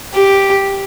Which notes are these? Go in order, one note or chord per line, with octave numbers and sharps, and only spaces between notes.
G4